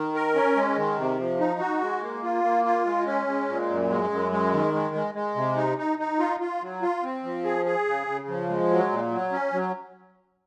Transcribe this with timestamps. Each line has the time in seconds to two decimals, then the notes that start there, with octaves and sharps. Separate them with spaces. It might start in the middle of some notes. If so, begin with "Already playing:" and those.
Already playing: D#3
0.15 A#4
0.35 C#4
0.56 G#3
0.77 D#3
0.98 C3
1.19 F3
1.40 D#4
1.60 F#4
1.81 G#3
2.02 A#3
2.23 F4
2.44 A#3
2.65 F4
2.85 G#3
3.07 C#4
3.27 G#3
3.49 A#2
3.69 F#2
3.90 G#3
4.10 F#2
4.32 G#3
4.53 D#3
4.74 G#3
4.95 G#3
5.15 G#3
5.36 C3
5.56 D#4
5.78 D#4
5.99 D#4
6.19 F4
6.40 F4
6.62 F#3
6.82 F4
7.03 C4
7.24 F3
7.44 G#4
7.65 G#4
7.87 C#3
8.07 C#3
8.28 F3
8.49 G#3
8.70 F#3
8.91 A#2
9.11 F#3
9.32 C#4
9.53 F#3